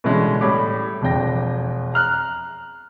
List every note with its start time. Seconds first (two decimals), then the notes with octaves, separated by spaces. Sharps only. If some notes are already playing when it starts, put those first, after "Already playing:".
0.04 B2 D3 E3 G3 G#3 C#4
0.41 A2 G3 C#5 B5 D6
1.02 E1 F2 D4 G5 A#6
1.94 A#5 F6 F#6